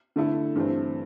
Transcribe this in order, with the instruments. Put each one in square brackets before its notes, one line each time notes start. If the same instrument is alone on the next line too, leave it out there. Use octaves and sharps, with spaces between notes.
[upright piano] D3 A3 E4 A4
G2 E3 A3 C4